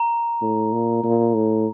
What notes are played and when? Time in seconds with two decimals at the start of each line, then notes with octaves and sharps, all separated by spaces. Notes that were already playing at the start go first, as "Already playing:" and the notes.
Already playing: A#5
0.42 A2
0.73 A#2
1.04 A#2
1.34 A2